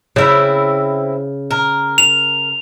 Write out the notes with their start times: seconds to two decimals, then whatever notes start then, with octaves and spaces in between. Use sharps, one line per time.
0.16 C#3 C4 E4 E5
1.51 A#4
1.98 F7